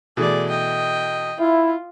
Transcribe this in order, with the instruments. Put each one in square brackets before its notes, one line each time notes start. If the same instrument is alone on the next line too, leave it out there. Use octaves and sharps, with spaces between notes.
[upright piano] B2 E3 A3 [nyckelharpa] G#4 D5
[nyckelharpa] D#5 G5
[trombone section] E4 [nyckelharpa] F4